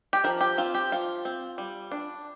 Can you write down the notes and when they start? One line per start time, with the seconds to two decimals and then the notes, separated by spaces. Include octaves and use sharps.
0.13 G4
0.24 F3 A#4
0.41 G4
0.58 C4 F4
0.74 G4
0.92 F3 F4
1.25 C4
1.58 G3
1.92 D4